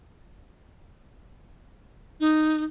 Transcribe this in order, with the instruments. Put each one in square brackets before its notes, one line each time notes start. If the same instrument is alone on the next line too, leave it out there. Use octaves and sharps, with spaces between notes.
[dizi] D#4